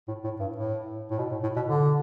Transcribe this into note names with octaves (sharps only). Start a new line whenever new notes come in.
A2
A2
G2
A2
A2
B2
A2
A2
B2
D3